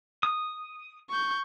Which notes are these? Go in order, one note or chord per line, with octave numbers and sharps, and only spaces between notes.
D#6
C#6 G6